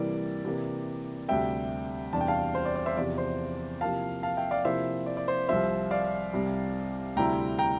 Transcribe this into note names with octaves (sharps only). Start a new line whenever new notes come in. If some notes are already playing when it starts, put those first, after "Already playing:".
Already playing: C3 E3 G3 A#3 E4 D5
C3 E3 A#3
D2 C3 G3 E5 G5
E2 C3 G3 D4 A5
G5
F5 A5
C5
D5
D5
C5 E5
E2 C3 F3 D5
C5
C3 F3 A#3 E4 F5 A5
F5 A5
E5 G5
D5 F5
C3 F3 A#3 E4 C5 E5
D5
D5
C5
C2 C3 F3 C4 C5 E5
D5 F5
C2 C3 G3
D2 C3 G3 C4 E4 G5 A#5
G5 A#5